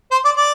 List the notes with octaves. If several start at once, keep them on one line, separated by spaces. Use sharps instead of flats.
C5
D5
D5